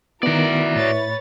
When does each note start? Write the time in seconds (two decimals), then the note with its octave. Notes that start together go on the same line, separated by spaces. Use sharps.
0.23 D#3 B3 E4 F#4 A#4 D5 D7
0.76 A2 B4 C#5 A6